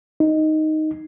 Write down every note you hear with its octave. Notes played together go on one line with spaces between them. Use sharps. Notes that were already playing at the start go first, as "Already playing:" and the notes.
D#4